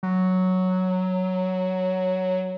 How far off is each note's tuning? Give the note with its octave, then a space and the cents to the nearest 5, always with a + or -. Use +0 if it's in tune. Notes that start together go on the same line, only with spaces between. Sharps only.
F#3 +0